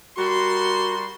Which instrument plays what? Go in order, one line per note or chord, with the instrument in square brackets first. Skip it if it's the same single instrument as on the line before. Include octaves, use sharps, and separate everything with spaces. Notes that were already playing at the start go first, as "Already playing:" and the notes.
[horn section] G3 A#4 C6 [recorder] F#4